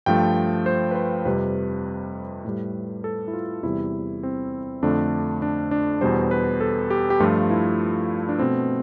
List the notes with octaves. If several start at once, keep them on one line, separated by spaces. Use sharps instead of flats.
G2 F3 A3 G5
C5
B4
C5
F2 C3 G3 B4
A2 G3
A4
E4
F4
E2 C3 G3 E4
C4
F2 D3 A3 D4
D4
D4
E2 B2 G3 C5
B4
A4
G4
G4
G2 F3 A3 F4
E4
D4
B2 A3 C4